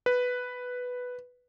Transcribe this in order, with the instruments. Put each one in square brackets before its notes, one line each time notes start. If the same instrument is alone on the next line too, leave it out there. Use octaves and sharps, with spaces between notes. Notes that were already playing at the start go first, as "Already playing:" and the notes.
[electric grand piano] B4